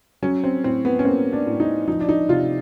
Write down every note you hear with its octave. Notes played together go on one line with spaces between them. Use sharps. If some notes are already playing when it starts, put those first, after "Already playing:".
F#3 C#4
C4
A2 C4
B3
C#4
A#3 C4
D4
A2
D#4
F3 D#4
D4
D#4
C3 F4